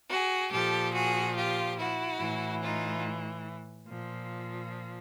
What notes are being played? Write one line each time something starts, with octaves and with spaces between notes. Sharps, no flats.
F#4 G#4
A#2 F3 G4 A4
F#4 G#4
F4 G4
E4 F#4
A2 E3
D#4 F4
A#2 F3